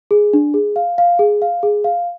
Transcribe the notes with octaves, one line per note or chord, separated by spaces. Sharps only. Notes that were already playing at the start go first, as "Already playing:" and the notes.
G#4
D4
G#4
F5
F5
G#4
F5
G#4
F5